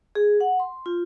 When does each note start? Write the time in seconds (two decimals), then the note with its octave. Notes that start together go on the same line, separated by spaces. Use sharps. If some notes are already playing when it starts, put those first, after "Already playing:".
0.15 G#4
0.41 F#5
0.60 C6
0.86 F4